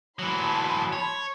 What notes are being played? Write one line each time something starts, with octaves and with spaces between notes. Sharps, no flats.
E3 F#3 A5 B5 C6
C#5